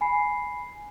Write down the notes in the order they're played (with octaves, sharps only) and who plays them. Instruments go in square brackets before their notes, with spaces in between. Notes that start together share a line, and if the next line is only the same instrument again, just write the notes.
[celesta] G#5 B5 C7